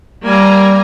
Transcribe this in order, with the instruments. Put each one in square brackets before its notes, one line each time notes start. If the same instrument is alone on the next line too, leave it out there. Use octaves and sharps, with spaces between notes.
[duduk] G3 [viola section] A#3 G#5 A#5